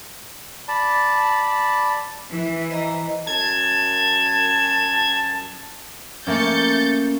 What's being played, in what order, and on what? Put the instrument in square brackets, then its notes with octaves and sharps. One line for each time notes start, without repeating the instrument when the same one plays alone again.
[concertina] D5 A5 B5
[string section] E3
[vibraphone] C5 D#5 A#5
[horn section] F#2 A5 [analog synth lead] G#6
[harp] A3 A#3 C#4 [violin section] G6 A6 C#7